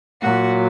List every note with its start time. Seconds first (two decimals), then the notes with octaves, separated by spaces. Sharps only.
0.22 A#2 F#3 F#4